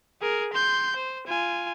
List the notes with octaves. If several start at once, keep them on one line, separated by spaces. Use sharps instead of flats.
G#4 A#4
C6 G6
C5
F4 G#5